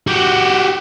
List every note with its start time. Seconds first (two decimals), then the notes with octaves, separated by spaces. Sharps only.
0.07 F#4 G4